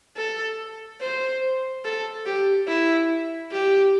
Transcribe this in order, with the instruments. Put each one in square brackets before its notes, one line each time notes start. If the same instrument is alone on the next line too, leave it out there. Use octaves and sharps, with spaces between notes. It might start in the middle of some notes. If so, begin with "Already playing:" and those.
[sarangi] A4
C5
A4
G4
E4
G4